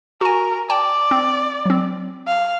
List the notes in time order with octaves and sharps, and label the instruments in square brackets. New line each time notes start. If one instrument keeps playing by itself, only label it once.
[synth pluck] F#4 G#5 [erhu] A#4
[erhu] D5 [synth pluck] G5 A5
[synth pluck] C4
F#3 C4
[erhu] F5